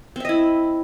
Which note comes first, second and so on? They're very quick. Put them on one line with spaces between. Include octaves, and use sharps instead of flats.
C4 E5 D#5 E4